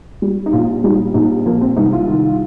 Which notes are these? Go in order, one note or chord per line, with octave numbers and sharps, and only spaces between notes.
G3
D#4
A#1 F4
G3 D#4
A#1 D#4
F3 A#3
C4
C2 D#4
F4
D#3